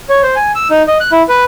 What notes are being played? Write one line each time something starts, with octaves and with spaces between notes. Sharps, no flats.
C#5
C5
G#5
E6
D#4
D#5
F#6
E4
B4